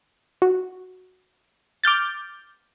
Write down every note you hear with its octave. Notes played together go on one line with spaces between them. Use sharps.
F#4
D6 F6 G6 A6